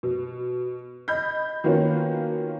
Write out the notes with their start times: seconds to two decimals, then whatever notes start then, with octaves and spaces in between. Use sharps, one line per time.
0.03 B2
1.08 D#5 B5 G6
1.64 D#3 A#3 B3 C#4 F4 F#4